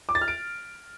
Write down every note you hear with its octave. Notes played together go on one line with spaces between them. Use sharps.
D6
A6
F6
D7